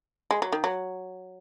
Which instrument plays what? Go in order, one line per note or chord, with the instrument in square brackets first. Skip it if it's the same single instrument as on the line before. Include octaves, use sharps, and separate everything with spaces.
[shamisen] G#3
F#3
D#3
F#3